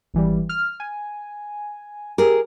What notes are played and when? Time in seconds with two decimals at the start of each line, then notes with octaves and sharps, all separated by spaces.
0.14 G#1 E3 G3
0.49 F6
0.80 G#5
2.18 G4 G#4 A#4